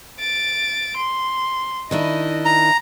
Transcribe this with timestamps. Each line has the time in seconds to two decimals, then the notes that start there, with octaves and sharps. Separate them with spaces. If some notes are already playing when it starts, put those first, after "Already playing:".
0.20 A6 D7
0.96 C6
1.91 D#3 D4 E4 D#5
2.45 A#5